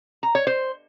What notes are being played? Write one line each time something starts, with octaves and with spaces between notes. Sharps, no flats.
A#5
C#5
C5